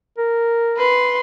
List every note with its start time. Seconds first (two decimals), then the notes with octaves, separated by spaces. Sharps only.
0.18 A#4
0.78 B4 C6